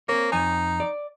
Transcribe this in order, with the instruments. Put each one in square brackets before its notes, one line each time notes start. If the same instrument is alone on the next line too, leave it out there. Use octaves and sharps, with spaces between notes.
[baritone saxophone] A#3 [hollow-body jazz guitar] C4 C#5
[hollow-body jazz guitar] F2 G#5 [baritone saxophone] D#4
[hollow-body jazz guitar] D5